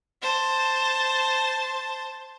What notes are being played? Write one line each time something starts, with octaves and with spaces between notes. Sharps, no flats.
C5 A5